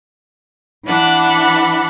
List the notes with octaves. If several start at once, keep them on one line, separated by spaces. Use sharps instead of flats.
E3 D4 F#5 B5